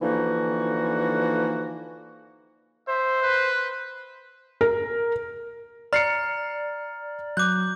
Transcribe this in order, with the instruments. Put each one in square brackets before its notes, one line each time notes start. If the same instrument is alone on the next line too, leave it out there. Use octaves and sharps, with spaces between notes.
[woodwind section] D3 E3 F3 A#3 D#4 F#4
[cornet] C5 [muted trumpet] E5
[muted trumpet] B4
[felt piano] A#4
[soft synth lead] D5 [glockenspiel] A#5 [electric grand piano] F6 C7 C#7
[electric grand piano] F#3 F#6 [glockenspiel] D6 G6